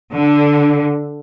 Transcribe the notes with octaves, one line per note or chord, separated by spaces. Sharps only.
D3